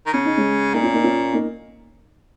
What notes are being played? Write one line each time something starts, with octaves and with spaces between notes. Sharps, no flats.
D#3
C#3 C#4
D#4
G#3 C#4
A#2 A#3 D#4
C#4 F4
A#3 D#4
C#4 F4
A#3 D#4